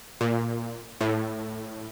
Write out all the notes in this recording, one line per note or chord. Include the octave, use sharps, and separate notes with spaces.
A#2
A2